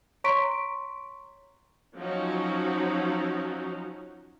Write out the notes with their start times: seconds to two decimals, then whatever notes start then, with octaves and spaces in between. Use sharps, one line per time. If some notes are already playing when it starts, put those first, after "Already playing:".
0.24 C#5 A#5 C6 C#6 B6 D7
1.95 F3 F#3 C#4 D#4 F#4